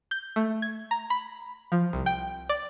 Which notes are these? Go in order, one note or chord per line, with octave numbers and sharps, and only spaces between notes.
G6
A3
G#6
A#5
B5
F3
C2
G5
D5